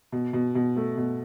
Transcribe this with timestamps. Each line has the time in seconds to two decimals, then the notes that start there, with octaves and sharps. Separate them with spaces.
0.12 B2
0.33 B2
0.55 B2
0.76 A3
0.97 B2